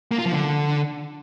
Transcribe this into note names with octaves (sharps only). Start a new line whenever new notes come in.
A#3
F4
F3
D3